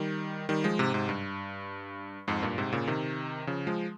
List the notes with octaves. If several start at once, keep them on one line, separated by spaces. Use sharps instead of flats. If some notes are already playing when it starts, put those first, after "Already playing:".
Already playing: D#3 G3
D#3 G3
F3 G#3
G#2 C3
G#2 C3
G2
F2 G#2
G2 A#2
G#2 C3
A#2 C#3
C3 D#3
C#3 F3
F3 G#3